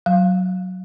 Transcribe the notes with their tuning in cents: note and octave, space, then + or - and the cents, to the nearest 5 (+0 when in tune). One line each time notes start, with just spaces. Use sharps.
F#3 +0 F5 -5